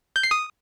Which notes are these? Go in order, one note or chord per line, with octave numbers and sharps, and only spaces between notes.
G6
C7
D#6